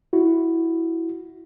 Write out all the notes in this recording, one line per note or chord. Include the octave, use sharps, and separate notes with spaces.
E4 F#4